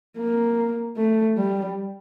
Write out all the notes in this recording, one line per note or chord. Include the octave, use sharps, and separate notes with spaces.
A#3
A3
G3